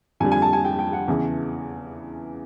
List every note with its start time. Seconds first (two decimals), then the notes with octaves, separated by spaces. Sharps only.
0.20 F2 D3 G3 G#5
0.32 G#5
0.42 A5
0.53 G#5
0.64 G5
0.79 G5
0.93 F#5
1.08 E2 C#3 E3